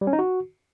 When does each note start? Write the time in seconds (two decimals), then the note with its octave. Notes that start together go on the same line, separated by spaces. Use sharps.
0.01 G3
0.07 C#4
0.13 D#4
0.19 F#4